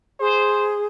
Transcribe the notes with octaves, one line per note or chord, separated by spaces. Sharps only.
G#4 C5